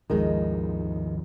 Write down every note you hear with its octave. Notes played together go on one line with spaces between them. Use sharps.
G#1 D#2 D#3 F3 G#3